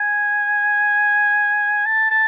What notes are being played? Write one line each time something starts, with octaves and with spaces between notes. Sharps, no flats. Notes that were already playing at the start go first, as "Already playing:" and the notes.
Already playing: G#5
A5
A5